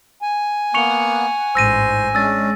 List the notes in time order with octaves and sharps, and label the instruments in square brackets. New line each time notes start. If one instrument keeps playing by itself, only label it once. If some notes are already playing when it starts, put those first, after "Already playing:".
[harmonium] G#5
[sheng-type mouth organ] A#3 B3 [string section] F#5 [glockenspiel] C#6 C#7 F7
[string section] A1 G#2 [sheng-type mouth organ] C5 [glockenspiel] E6 A#6 D#7
[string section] G#3 [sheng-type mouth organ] C#4 D4 [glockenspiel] E6 A6